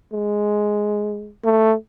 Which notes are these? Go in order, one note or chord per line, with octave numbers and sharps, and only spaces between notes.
G#3
A3